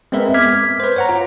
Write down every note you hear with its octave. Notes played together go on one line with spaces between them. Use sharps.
G#3 B3 C4 A#4 B4 E5
D6 F6 G#6 B6
B4 C5
C#5 F#5 A#5
F4